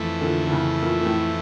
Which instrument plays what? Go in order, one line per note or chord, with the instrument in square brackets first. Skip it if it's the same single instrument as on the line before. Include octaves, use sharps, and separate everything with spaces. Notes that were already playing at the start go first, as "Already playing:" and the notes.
Already playing: [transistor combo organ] F2 E3 A3
[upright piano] A#2 D3
D3
A2 C#3
A#2
A#2
A2